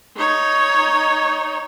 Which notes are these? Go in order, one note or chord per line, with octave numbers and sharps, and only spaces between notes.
D#4 C#5